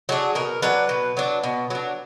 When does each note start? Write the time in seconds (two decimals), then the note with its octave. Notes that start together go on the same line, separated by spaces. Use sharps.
0.09 F#3 D4 G#4
0.35 B2 A#4
0.62 F#3 D4 B4
0.89 B2
1.17 F#3 D4
1.43 B2
1.70 F#3 D4